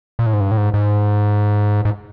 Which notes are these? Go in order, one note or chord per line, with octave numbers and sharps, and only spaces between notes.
A#2
A2
G#2
G2
A2
G#2
G#2
G#2